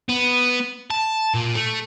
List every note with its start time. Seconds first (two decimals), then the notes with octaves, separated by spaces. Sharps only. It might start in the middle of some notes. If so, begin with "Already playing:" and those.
0.09 B3
0.91 A5
1.34 A#2
1.56 A3